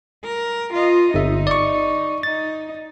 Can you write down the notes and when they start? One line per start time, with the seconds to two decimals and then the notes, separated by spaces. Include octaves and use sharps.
0.24 A#4
0.73 F4 D#5
1.14 G1 D#4 E5
1.47 D5 C#6
2.23 D#4 A6